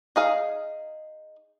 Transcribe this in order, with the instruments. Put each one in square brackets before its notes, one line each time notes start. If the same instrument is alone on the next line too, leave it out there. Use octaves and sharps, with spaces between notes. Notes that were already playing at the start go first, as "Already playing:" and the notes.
[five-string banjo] D#4 G#4 F5